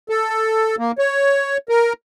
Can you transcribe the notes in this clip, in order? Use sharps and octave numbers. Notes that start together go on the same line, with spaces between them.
A4
A#3
C#5
A#4